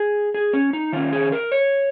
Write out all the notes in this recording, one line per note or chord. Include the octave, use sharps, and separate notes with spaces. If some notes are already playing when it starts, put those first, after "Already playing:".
Already playing: G#4
G#4
C#4
D#4
D#3 C#4 F4
G#4
A#4
C#5